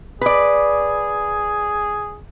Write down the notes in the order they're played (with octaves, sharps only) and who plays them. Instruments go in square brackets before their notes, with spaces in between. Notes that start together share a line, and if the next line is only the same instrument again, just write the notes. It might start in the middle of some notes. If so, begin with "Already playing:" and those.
[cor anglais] G#4 [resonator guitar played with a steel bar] B4 D5